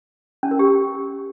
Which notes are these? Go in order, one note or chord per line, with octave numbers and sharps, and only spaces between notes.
C#4
A#4
G4